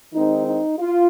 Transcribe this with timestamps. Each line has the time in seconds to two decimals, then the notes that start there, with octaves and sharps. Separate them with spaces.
0.13 D#3 G#3 C4 D#4
0.47 D#4
0.79 F4